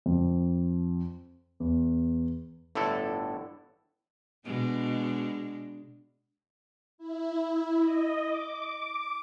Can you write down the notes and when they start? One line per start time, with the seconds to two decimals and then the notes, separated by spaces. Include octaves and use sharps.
0.06 F2
1.60 E2
2.75 G1 A2 D3 E4 A4
4.45 B2 G#3 D4
6.98 E4
7.81 D#5
8.27 D6